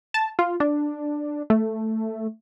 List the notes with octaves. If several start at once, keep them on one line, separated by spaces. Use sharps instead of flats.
A5
F4
D4
A3